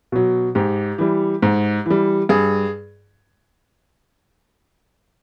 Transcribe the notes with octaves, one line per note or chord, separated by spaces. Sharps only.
B2 F#3
G#2 G4
E3 G3
G#2
E3 G3
G2 G#4